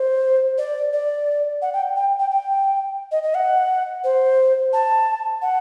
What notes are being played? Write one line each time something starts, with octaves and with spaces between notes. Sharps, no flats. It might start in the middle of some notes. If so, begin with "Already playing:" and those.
Already playing: C5
D5
D5
F#5
G5
G5
G5
G5
D#5
D#5
F#5
C5
A5
F#5